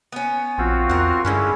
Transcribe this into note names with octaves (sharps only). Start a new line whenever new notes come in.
B3 C#4
A#1 C4 F4 F#4
E2 A#4 F#5
G2 D3 G3 G#3 C#4 E4